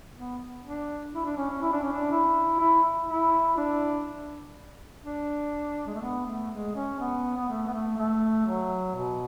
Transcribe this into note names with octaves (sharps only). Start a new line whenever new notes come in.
B3
D4
E4
D4
C#4
C#4
E4
D4
C#4
D4
E4
E4
E4
D4
D4
G#3
A3
B3
A3
G#3
C#4
B3
B3
A3
B3
A3
A3
F#3
B2